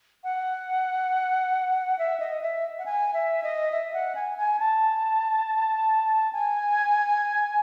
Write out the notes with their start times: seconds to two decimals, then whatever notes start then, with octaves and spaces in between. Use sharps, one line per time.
0.24 F#5
1.99 E5
2.20 D#5
2.41 E5
2.79 F#5
2.86 G#5
3.14 E5
3.43 D#5
3.72 E5
3.94 F#5
4.15 G#5
4.38 G#5
4.59 A5
6.33 G#5